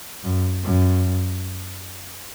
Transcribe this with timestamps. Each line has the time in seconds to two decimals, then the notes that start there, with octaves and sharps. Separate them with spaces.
0.24 F#2
0.64 F#2